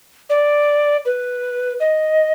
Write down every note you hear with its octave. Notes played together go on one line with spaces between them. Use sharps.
D5
B4
D#5